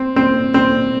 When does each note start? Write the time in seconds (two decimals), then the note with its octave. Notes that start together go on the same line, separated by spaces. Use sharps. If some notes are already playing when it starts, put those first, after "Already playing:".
Already playing: C4
0.16 C4
0.54 C4